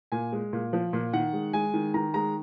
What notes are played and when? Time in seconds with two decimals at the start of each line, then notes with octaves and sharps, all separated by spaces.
0.12 A#2 G#5
0.32 G#3
0.53 A#2
0.73 F3
0.93 A#2
1.13 D#3 F#5
1.33 G#3
1.53 G#3 G#5
1.74 D#3
1.94 D#3 A#5
2.14 G#3 A#5